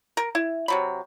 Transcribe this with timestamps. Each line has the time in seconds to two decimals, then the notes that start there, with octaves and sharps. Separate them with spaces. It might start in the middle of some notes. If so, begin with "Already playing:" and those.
0.17 A#4
0.35 E4
0.68 C3 F#3 B5